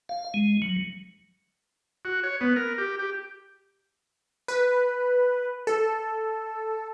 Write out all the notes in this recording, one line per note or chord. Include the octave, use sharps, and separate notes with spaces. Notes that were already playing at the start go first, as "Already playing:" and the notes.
F5
G#3
F#3
F#4
C#5
B3
A#4
G4
G4
B4
A4